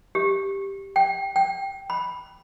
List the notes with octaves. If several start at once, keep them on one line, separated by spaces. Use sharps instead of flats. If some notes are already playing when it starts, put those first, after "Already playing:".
G4
G5
G5
B5